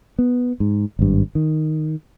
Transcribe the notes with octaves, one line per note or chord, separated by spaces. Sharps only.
B3
G#2
G#1 G2
D#3